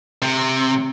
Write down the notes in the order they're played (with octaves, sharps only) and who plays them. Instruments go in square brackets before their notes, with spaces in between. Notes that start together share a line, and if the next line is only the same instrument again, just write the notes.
[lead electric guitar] C3